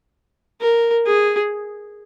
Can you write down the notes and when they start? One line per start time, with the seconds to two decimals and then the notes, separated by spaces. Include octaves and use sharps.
0.61 A#4
1.06 G#4